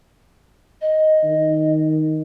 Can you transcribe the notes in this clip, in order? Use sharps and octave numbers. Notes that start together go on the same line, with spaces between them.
D#5
D#3